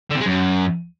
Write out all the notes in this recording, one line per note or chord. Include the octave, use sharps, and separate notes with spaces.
D3
C3
G#3
F#2